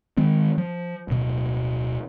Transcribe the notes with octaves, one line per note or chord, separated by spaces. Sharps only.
D#3 G#3 C4
F3
D1 B2